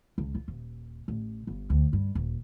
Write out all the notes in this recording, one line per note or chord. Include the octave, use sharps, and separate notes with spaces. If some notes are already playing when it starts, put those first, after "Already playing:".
C#2
F4
D#1
A1
G1
D2
G2
D#1